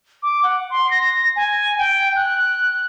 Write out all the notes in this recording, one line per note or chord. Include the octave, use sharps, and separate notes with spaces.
D6
F#5
C6
A#6
G#5
G5
F#6